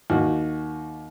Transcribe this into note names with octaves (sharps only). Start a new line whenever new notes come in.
D#2 F#4